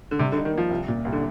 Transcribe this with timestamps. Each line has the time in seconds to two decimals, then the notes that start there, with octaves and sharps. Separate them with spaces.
0.11 D3
0.19 C3 G3
0.32 D3
0.36 D#4
0.45 D#3
0.53 F3 A#3
0.70 C2
0.88 A#2
1.05 C2
1.13 D3